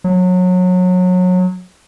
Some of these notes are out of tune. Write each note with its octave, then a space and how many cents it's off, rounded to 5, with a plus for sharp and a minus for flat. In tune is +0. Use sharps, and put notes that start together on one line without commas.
F#3 -25